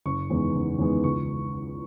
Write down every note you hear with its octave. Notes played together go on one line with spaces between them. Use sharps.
F#1 C#6
E2 D#3 G#3 B3
F#1
E2 D#3 G#3 B3
C#2 C#6